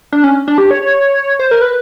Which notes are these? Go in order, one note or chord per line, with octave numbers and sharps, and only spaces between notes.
D4
C#4
D4
G4
C#5
C5
A#4
B4